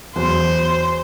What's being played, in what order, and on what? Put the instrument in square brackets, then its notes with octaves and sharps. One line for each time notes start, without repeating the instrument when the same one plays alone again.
[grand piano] E2 F#3 C6 [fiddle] C5